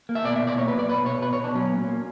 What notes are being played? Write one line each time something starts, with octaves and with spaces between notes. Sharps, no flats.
A#3
E5
B2 D5
E5
B2
D5
A#3 C#5
B4
F#3
D5
B2 B4
B2 C#5
B2 B4
C#5
B2 D4
F#3 C#4
A#2
A#3